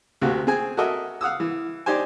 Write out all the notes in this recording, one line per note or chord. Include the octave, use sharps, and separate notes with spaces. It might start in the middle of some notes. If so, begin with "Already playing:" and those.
D2 C3 A#3 F#4
C4 G#4 G#5
F#4 A4 A#4 D#5 E5
F5 F#5 D#6 E6
E3
D4 D#4 G4 C5 G#5